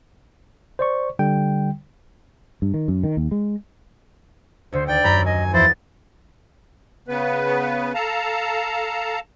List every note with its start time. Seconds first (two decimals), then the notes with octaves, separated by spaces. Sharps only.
0.79 C5 D5 C#6
1.19 D3 G3 G5
2.62 G2
2.74 D#3
2.88 F#2
3.04 D#3
3.17 D#2
3.31 G#3
4.72 D2 D3 C5
4.88 D#2 D5 G5
5.04 F#2 A#5 B5 G6
5.26 D#5 G#5
5.53 E2 F3 E4 C5 A6
7.08 C#3 B3 B4
7.94 A4 F5 A5 A#5